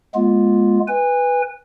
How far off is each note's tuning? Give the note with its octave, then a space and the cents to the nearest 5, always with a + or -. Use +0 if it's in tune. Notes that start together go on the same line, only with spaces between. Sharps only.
G#3 +10 B3 -40 F4 +0
B4 +0 G#5 -30